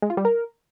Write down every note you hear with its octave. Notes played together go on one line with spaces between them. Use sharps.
G#3
F4
G3
A#4